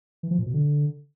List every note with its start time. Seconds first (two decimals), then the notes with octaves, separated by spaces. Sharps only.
0.23 E3
0.31 F3
0.38 A#2
0.46 B2
0.54 D3